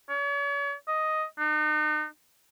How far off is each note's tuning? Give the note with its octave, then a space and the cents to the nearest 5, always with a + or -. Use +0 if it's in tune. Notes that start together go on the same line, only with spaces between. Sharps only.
C#5 +40
D#5 +5
D#4 -40